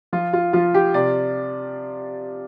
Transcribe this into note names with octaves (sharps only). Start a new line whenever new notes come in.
F3 F4
F4
F3 F4
G4
C3 D5